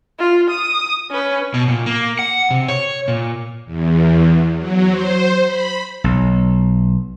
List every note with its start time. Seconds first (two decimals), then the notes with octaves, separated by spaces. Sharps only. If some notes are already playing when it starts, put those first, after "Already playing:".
0.19 F4
0.50 D#6
1.11 C#4 B4
1.54 B2
1.68 A#2
1.86 A#3
2.19 F#5
2.51 C3
2.68 C#5
3.08 A#2
3.66 E2
4.57 F#3
4.90 C5
5.46 B5
6.04 B1